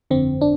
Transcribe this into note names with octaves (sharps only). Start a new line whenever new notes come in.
G1 F2 D3 C4
D4